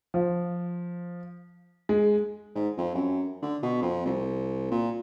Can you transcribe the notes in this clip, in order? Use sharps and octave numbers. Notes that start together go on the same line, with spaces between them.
F3
G#3
G#2
F2
F#2
D3
B2
F2
C2
A#2